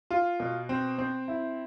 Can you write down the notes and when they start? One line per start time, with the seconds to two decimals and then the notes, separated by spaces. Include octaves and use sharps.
0.11 F4
0.40 B2
0.69 C4
0.98 C4
1.28 E4